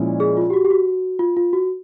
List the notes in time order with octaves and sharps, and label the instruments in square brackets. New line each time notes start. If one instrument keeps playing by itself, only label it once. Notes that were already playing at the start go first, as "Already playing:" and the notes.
Already playing: [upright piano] A#2 F3 G#3 C#4 E4
[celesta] G#4
F4
G4
F#4
G4
F#4
F4
F4
F#4